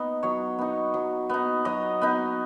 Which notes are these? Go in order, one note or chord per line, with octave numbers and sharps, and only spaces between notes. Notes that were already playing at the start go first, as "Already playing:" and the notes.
Already playing: B3 D#4
F#3 C#5
B3 D#4
F#3
B3 D#4
F#3 D#5
B3 D#4